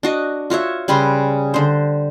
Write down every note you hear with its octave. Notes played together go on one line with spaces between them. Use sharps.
D4 F#4 D#5
F4 F#4 C#5 E5
C#3 G3 B4 C6
D3 C5